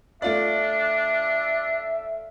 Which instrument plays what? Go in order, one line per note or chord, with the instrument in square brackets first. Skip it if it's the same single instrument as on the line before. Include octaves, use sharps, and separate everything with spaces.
[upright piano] A3 F4 D5 [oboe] D4 [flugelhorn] E5